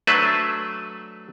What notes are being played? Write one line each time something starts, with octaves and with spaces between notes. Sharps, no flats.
F#3 A3 D4 B4 C5 E5